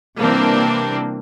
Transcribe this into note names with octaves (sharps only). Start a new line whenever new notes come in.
C3 E3 G3 A#3 C4 D4